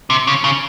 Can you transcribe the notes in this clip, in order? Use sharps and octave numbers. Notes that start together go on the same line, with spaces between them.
C3
C#3
C#3